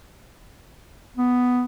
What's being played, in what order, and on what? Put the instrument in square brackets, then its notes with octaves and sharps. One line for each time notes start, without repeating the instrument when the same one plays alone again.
[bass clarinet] B3